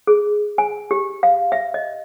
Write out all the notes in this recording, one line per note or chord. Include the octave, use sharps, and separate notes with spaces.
G#4
G#5
G4
F5
E5
D#5